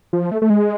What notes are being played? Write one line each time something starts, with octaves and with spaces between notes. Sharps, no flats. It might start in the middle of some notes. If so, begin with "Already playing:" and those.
F3
A3
A3
G#3